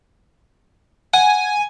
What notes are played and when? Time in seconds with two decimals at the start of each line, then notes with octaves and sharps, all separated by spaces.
1.14 F#5 G#5